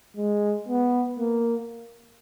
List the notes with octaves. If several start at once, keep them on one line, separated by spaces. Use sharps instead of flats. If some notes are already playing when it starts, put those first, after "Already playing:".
G#3
B3
A#3